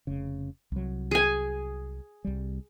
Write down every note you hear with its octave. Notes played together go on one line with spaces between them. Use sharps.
F1 C#3
C2 F#3
G#4 G#5
C2 G3